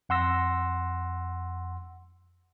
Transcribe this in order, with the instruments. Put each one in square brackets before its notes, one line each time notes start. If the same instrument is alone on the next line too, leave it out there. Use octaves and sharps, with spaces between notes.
[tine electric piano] F2 F#5 C6 E6 A#6